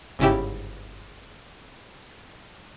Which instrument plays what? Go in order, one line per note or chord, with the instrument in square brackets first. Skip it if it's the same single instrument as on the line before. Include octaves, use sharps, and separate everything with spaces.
[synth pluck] G1 G#2 C#3 E4 G4